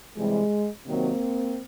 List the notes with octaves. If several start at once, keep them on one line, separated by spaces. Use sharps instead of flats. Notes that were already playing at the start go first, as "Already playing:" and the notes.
C3 E3 G3 G#3
C3 D#3 F#3 A#3 C4